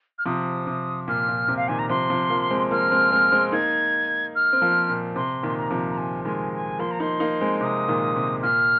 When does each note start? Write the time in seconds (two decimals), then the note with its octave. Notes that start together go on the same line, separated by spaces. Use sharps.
0.18 F6
0.25 C3 F3 D#6
0.67 C3
1.08 A#2 F6
1.28 A#2
1.48 C3
1.56 F5
1.68 A#2 D#3 G#5
1.79 A#5
1.89 C3 F3 C6
2.10 C3 F3
2.30 F3 A#3
2.50 G#3 C4
2.71 F3 A#3 F6
2.91 G#3 C4
3.12 G#3 C4
3.32 G#3 C4
3.52 A#3 D#4 G#6
4.35 F6
4.53 C4
4.61 F3 A#3
4.89 A#2
5.16 C3 C6
5.43 A#2 D#3 C6
5.57 A#5
5.70 C3 F3
5.90 A#5
5.97 G#5
6.24 D#3 G#3 G#5
6.53 G#5
6.79 F3 A#3 C6
6.91 A#5
7.00 A#3 D#4 C6
7.20 A#3 D#4
7.41 G#3 C4
7.61 C3 D#6
7.88 A#2 D#3
8.16 C3
8.42 A#2 F6